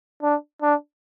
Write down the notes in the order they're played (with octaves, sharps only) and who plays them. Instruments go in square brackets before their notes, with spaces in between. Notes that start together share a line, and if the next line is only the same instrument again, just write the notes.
[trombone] D4
D4